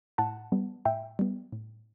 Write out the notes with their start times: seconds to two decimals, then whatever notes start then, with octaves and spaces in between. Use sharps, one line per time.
0.18 A2 F#5 A5
0.52 G3 B3
0.85 A2 E5 G5
1.19 G3 B3
1.53 A2